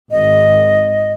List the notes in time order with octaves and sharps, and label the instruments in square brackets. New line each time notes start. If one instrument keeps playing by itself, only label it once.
[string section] G#1 [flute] D#5